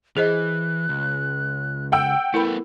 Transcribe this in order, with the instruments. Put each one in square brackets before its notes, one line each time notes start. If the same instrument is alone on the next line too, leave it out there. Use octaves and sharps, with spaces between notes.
[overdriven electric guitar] E3 [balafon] G#4 C5 D#5 [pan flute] F#6
[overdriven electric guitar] C#2
[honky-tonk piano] F#5 G5 E6
[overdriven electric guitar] A3 B3 [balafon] E4 A#4 B5